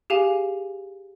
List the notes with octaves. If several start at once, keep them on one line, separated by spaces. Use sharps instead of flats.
G4 G#4 F5 G#5